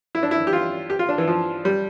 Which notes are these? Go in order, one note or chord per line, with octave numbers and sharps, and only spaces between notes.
E4
D4
E4
G4
F4
G4
F4
D4
E3
F3
G3